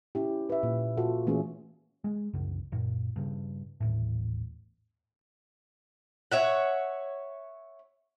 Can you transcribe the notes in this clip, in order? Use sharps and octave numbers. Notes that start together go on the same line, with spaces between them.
C#4 E4 G4
B4 E5
A#2
F4 F#4 A4
E3 A3 A#3 C#4 G#4
G#3
C2 F#2 C#3
F#2 A#2
G2 C#3
D#1 A1 A2
C#5 E5 F#5